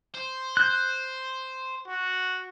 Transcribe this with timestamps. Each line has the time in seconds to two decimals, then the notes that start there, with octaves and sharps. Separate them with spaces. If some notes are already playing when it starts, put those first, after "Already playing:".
0.15 C5
0.57 F#6 G6
1.87 F#4